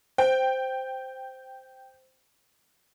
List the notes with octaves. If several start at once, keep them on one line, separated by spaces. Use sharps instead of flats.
C5 G5